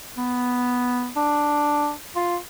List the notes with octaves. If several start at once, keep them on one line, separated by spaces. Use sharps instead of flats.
B3
D4
F4